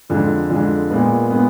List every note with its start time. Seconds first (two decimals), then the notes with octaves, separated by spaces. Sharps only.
0.10 F2 D3 G#3
0.50 F2 D3 G#3
0.90 A#2 G#3 B3
1.30 A#2 G#3 B3